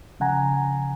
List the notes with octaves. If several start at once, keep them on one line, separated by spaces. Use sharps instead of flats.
C#3 F3 F#5 G#5 A#5